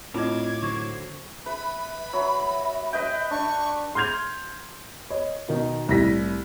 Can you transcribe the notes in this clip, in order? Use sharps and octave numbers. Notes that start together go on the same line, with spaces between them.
A2 C4 D4 F4 A#4 D#5 D6 G#6
D3 F#3 C5 C#6
B4 E5 B5
F#3 E5
B4 D#5 G5
D4 C#6
C6 F6 G6 G#6 F7
C#5 D#5
B2 D#3 D#4
C2 A2 E4 A#6 B6